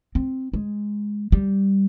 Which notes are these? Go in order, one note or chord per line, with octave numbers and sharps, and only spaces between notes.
C4
G#3
G3